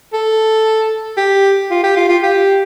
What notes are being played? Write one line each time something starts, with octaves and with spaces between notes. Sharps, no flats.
A4
G4
F4
G4
F4
F4
G4